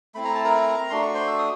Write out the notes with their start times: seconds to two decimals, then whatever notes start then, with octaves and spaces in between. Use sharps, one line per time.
0.15 A3 C4 E4 B5
0.24 A#5
0.34 A5
0.45 A#4 A#5
0.90 A3 D4 F#4 C6
1.02 C#6
1.14 C5 C6
1.28 E6
1.38 D#6